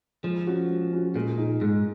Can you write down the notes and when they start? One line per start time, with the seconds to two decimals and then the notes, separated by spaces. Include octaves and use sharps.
0.23 F3 G#3
0.47 C#4 F#4
0.69 G#3
0.92 C#4 F#4
1.15 A#2 G#3
1.38 D#4 G#4
1.61 G#2 G#3